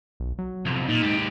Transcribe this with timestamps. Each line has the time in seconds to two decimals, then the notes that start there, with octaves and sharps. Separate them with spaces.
0.20 B1
0.39 F#3
0.66 B1 F2 C3
0.89 A#2 D#4
1.02 G#2 G4